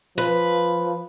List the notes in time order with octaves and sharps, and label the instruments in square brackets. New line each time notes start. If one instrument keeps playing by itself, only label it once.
[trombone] F3 [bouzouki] B4